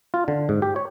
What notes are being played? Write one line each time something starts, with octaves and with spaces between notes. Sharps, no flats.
F4
D3
G#2
G4
C#5